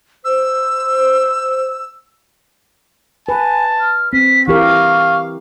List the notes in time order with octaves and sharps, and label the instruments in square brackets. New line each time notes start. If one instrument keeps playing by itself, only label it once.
[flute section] C5 [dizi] E6
[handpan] B4 [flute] G#5 [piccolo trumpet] A5
[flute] F6
[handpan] C4 [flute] B6
[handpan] E3 G4 A#4 [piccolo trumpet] F5 [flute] C#6